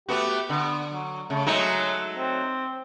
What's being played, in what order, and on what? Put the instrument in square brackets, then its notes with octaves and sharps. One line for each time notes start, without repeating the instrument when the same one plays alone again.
[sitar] A3 B3 F#4 [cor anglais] G4
[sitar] D3 [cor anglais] B3
[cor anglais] F#3
[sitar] C#3 [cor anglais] A3
[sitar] F#3 A3 D#4 [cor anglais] G#3
[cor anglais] C4